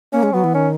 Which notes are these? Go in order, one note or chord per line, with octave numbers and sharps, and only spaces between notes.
A#3 C#4
G#3
F#3 B3
E3
D#3 C#4